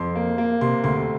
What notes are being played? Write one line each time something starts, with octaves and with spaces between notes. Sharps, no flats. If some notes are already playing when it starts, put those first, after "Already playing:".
Already playing: F2 C6
A#3
A#3
C3 C6
D2 C6